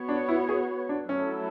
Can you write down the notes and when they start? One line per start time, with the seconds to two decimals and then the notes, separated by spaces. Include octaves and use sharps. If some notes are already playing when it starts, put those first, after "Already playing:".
Already playing: B3 F#4 C#5
0.09 D4
0.29 E4
0.49 G#4
0.89 D4
1.09 F#3 A3 C#4 E4 A4